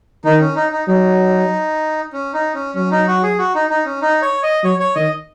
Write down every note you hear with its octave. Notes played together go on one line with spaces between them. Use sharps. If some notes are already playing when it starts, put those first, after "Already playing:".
D#3 D#4
C#4
D#4
D#4
F#3 D#4
C#4
D#4
C#4
F#3 C#4
D#4
F#4
G#4
F#4
D#4
D#4
C#4
D#4
C#5
D#5
F#3 C#5
C#5
D#3 D#5